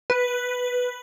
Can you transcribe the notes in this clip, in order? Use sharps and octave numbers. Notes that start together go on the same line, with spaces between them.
B4